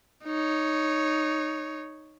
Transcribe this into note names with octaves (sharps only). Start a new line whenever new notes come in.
D#4 C#5